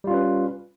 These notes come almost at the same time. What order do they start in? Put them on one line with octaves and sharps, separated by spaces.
G3 F4 C#4 B4